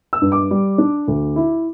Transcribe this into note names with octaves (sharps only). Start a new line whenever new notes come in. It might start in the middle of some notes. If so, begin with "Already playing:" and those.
E6
G2
D6
G3
D4
D2
E4